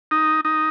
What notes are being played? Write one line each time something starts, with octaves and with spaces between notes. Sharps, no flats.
D#4
D#4